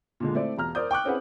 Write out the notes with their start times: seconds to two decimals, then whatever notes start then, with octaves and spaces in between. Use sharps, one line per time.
0.20 A#2 D3 G#3
0.35 A3 C4 E4 D5
0.58 E1 A#5 F6
0.75 A#4 C5 D5 D#6 G6
0.91 G5 C#6 D6 F#6
1.05 C4 C#4 E4 G#4 B4 F#5